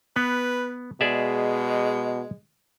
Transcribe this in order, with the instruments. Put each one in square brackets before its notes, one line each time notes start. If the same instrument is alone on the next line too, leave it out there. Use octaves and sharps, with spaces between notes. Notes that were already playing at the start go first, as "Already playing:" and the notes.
[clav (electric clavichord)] B3 [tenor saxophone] B4
[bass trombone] B2 [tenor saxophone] G#3 [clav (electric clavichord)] G#4 D5 E5